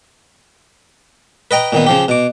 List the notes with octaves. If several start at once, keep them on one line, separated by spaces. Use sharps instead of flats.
B4 D#5 G5 A#5
A#2 D#3 B3
C#3 F3 G4
B2 D6